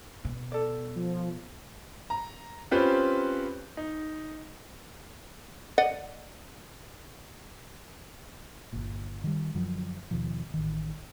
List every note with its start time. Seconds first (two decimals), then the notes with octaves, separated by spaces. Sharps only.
0.25 B2
0.52 A4 D5
0.96 F3
2.10 A#5
2.71 C4 C#4 F4 G4 B4 C5
3.77 D#4
5.78 D5 D#5 F#5
8.73 G1 A#2
9.24 D#3 G3
9.55 F#2 D3 F3 F#3
10.11 D#2 B2 D#3 F3
10.54 A1 D#3